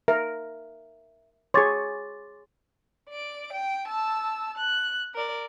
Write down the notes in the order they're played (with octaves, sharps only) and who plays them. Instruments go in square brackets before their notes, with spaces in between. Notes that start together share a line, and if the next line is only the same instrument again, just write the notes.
[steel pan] A#4 [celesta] E5
[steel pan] G#4 C#5 [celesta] C6 D6 A6
[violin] D5 D7
G5
A5 E6
F#6
A#4 D5